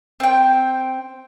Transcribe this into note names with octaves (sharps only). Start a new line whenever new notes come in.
C4 G5